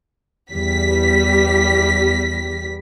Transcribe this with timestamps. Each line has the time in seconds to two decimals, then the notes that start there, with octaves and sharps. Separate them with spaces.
0.51 E2 G3 B6